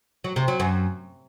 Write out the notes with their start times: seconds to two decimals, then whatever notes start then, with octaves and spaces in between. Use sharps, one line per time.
0.24 F#3
0.36 C3
0.48 F#3
0.60 F#2